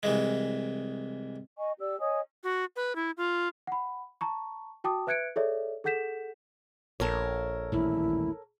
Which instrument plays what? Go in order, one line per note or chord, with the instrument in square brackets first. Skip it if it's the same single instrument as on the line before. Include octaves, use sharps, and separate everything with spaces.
[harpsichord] C2 E3 G#3
[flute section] D#5 G#5 C#6
G4 D5 E6
C#5 D#5 G#5 D#6
[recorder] F#4
B4
E4
F4
[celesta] F#5 B5
A5 A#5 C#6
F#4 G5 A5 D6 D#6
B4 E5 F#6 G#6 C#7 D7
G#4 A4 C#5 D5 E5
G#4 A4 F#5 G6 B6 E7
[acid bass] A#1 [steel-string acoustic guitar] A4 A#4 C#5
[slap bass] D#1 A1 [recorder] E4